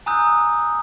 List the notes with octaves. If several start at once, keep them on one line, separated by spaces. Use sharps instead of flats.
G#5 A#5 D#6 E6 F#6 G6